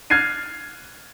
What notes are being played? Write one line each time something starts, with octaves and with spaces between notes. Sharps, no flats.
F6 F#6 G#6 A6 C7 D#7